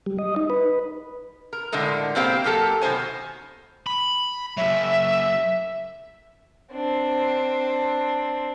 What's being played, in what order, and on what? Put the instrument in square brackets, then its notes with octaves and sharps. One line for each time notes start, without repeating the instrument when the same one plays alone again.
[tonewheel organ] G3
D#5
D#4
B4
[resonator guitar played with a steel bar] A#4
A2 D3 F3 G#3 A#4
B2 A#3 C4 G4 F5 G5
F#3 A#3 G4 A4 A#4
B2 D#3 F3 C5 G#5
[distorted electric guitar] B5
[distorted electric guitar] C#3 F#3 [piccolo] E5
[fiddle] C4 D4